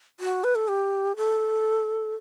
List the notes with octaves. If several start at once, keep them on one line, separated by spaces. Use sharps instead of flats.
F#4
B4
A4
G4
A4